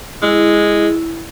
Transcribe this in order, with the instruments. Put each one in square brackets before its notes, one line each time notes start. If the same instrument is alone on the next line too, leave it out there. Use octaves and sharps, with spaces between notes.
[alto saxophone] G#3 [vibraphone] E4